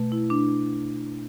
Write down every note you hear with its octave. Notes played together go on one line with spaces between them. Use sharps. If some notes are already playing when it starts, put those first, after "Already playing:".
Already playing: B2 A3
E4
D4